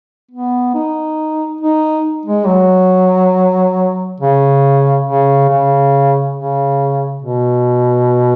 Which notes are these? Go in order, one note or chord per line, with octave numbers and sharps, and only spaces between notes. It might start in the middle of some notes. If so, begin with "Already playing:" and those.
B3
D#4
D#4
G#3
F#3
C#3
C#3
C#3
C#3
B2